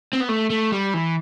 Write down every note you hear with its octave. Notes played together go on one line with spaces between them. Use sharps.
C4
B3
A3
A3
G3
E3